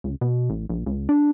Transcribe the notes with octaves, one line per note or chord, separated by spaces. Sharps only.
C#2
B2
A1
A#1
C#2
D4